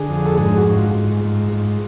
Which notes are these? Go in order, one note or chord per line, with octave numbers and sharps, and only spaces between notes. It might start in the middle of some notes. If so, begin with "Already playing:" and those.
Already playing: D3 G#4
F2
A4
G#2 G#4
F#4
G#2
F4
G#2
G#2
G#2